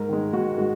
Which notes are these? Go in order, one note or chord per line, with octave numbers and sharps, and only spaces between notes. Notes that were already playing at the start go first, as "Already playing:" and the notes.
Already playing: G#2 A#4
D#3 G#3
G#2 F#4
G#3 F#4